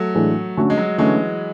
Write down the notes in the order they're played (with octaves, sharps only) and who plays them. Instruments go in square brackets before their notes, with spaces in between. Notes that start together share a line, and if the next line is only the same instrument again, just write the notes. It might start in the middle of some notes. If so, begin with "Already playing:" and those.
Already playing: [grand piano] F#3 A3
[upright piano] A2 E3 G#3 D4
D3 A3 C#4 F#4
[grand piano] G#3
F#3
[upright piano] D3 A3 C#4 F#4 [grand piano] E3 G#3